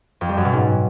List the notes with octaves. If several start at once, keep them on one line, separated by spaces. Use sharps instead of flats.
F2
G3
F#2
B2
G#2